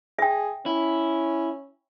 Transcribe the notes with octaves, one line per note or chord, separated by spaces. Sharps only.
G#4 E5 G5
C#4 E4